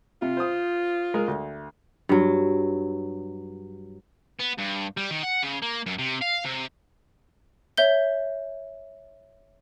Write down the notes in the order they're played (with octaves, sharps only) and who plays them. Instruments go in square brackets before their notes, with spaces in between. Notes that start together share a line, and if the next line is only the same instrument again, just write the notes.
[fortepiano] C3 [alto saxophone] F4
[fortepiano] C5 D#6
G#3 A#4
D2
[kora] G2 F#3
[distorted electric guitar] B3
G2
G3
D#3
F#5
C#3
A#3
F#2
C3
F5
C3
[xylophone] C#5 E5 G6 G7